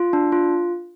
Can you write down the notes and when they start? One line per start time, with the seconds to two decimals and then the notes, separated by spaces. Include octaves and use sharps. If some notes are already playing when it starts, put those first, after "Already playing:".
Already playing: F4
0.13 D4
0.32 F4